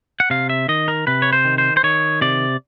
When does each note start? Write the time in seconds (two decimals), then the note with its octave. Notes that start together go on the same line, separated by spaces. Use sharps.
0.20 F#5
0.30 C3 F5
0.49 E5
0.69 D#3 D#5
0.88 A#4
1.07 C3 B4
1.22 C#5
1.33 C5
1.45 D#3
1.58 C5
1.77 C5
1.83 D#3 C#5
2.21 C3 D5